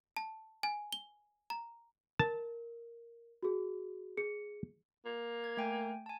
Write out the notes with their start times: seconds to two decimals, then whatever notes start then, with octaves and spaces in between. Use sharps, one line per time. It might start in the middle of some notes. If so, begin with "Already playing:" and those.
0.17 A5
0.63 G#5
0.92 G7
1.50 A#5
2.19 A#4 A5
3.43 F#4 G#4
4.17 G#4 C#7
5.05 A#3
5.44 G#6
5.57 A3 G5 G#5
6.06 G#5 A5